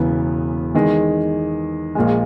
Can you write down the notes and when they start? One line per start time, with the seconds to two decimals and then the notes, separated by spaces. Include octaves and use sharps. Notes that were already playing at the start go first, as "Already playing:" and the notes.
Already playing: E1 E2 C#3 E3 B3
0.75 E2 D#3 G#3
1.95 A#1 A#2 G#3